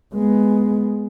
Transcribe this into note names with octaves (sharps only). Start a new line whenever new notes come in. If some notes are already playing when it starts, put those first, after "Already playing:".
G#3 B3